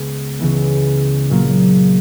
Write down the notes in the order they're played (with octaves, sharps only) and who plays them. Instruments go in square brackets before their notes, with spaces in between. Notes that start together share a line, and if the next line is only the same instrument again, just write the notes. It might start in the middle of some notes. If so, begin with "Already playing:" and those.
Already playing: [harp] C#2 C#3 G#3 B3
C#2 C#3 E3 G#3 B3
A#2 F#3 A#3